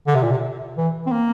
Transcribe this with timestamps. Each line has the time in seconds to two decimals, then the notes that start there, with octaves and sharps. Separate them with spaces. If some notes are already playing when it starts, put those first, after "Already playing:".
0.07 D3
0.15 C3
0.23 A#2
0.32 C3
0.77 E3
1.07 C4
1.12 A#3